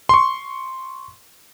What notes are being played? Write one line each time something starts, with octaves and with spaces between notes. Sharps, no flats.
C6 C#6